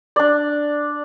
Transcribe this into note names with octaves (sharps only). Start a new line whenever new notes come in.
D4 D5